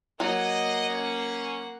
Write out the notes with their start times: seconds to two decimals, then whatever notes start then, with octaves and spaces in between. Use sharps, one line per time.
0.20 F#3 A#3 D#5 F#5
0.89 C#4